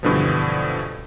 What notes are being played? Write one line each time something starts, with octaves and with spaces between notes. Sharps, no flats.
G2 B2 D3 E3 F3